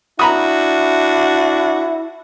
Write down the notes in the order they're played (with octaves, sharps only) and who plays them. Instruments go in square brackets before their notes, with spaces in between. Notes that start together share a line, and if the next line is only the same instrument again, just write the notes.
[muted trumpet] D4 [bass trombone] E4 [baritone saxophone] F#4 [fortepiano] A#5 B5 D#6